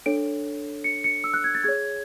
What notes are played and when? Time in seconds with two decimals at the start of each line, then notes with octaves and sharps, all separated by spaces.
0.06 D4 A4 C#5 D7
0.84 C#7
1.04 C#7
1.24 E6
1.34 F#6
1.44 G#6
1.55 A6
1.64 G#4 C#5 G#6